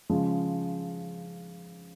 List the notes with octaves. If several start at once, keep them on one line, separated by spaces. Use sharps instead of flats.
C#3 F3 G#3